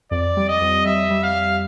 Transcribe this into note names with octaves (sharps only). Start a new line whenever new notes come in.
F2 D5
G3
D#5
F2
G3 E5
G3
F5
G3